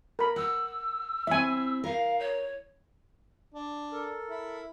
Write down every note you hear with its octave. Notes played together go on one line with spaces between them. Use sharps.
A#4 B5
F#5 E6
C4 E4 E5 G#5
A#4 F5
C#5
D4
A4 A#4
E4